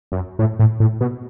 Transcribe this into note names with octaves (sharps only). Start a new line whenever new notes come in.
F#2
A2
A2
A2
B2